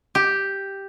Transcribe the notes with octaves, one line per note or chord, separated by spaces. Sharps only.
G4